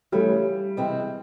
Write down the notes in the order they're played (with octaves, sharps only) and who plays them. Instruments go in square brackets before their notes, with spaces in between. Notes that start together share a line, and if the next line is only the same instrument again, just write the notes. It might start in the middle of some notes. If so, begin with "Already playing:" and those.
[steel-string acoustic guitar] C#3 E3 A3 [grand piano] G3
[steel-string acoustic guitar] C3 E3 G#3 C4 E4